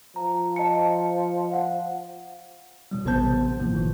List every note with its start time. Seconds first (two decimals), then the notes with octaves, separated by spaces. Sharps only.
0.16 F3 A#5
0.56 D#5 A5 C#7
1.52 F5 F#5
2.91 B2 F#3 G3
3.05 A1 C3 B3 C5 A5 G6
3.60 A2 C3 F3 A#3
3.73 G1 D#3 E3